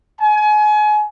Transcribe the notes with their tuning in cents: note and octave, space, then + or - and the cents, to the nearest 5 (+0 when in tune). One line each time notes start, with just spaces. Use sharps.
G#5 +30